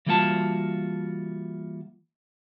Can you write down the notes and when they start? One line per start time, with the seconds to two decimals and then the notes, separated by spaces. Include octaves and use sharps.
0.06 E3 G3 A#3 F4 F#4 A5